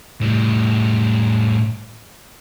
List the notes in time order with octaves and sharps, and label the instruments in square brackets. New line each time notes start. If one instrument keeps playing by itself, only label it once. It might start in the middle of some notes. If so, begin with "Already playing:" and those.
[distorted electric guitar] A2 G3